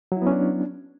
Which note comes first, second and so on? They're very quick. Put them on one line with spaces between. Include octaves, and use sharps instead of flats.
F#3 E4 B3 C#4 D4